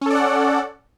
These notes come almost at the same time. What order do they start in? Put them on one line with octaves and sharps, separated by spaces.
C#4 A4 D5 F#5